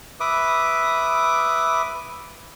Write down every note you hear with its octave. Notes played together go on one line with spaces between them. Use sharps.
B4 E5 D6 D#6